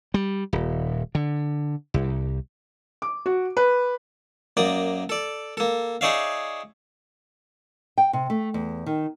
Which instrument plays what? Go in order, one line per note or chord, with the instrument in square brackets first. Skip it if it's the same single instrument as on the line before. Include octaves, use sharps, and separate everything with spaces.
[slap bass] G3
D#1
D3
C2
[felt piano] D6
F#4
B4
[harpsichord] F#2 A#3 D5 D#6
A4 D5
A#3 A4
D#4 G#4 C#5 D5 E5 F5
[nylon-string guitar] G5
C3
A3
E2
D#3